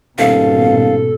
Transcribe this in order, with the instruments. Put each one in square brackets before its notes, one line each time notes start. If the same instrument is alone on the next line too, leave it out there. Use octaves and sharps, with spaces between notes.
[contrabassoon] D#1 [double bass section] G#2 B2 [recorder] A4 [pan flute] F5